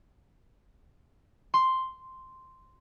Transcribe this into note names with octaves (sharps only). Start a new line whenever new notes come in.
C6